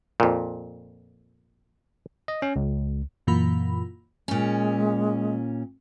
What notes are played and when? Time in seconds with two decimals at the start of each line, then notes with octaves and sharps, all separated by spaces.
0.20 F2 A#2
2.28 D#5
2.42 C#4
2.56 C#2
3.27 F#2 A#2 E3 A#3 F4 B5
4.28 A#2 G#3 C#4